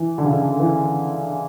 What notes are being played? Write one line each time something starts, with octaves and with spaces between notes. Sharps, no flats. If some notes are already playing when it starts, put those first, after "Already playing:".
Already playing: E3
D3
C#3
D3
E3